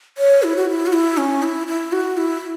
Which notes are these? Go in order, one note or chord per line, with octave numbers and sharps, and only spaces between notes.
C#5
E4
F#4
E4
F#4
E4
C#4
E4
E4
F#4
E4